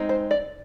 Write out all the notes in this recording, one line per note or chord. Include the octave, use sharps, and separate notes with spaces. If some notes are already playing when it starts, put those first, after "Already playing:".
Already playing: G#3 C4 D#4
C5
D5